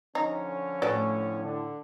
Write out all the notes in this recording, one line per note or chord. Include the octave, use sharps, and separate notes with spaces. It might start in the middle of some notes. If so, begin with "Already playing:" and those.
D3 F3 C#4 D#4
A2 A3 F#4 B4 D5
D3